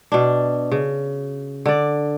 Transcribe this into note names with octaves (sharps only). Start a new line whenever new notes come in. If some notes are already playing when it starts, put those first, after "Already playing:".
B2 D4
C#3
D3 D5